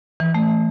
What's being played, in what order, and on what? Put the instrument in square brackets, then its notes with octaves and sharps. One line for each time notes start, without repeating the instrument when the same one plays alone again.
[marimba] E3
A3